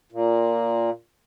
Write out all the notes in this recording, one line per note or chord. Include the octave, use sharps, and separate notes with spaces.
A#2